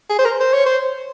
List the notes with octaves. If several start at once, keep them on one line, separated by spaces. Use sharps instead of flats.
G#4
C5
A#4
C5
C#5
C5